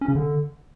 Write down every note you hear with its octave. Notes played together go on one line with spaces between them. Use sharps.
C#4
C#3
D3